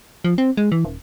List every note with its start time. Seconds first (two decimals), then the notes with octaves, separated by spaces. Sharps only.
0.24 F3
0.38 C4
0.57 G#3
0.72 E3
0.84 D#1